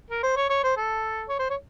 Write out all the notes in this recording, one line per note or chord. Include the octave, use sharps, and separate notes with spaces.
A#4
C5
C#5
C#5
C5
A4
C#5
C5
C#5